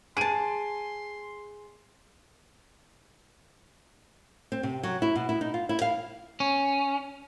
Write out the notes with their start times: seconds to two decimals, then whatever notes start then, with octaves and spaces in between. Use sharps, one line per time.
0.17 G#4 A5 C6 D7 D#7
4.52 C4
4.63 C3
4.83 F#3
5.02 E4
5.16 B2
5.29 E4
5.41 D#4
5.54 F4
5.69 E4
5.82 F5
6.40 C#4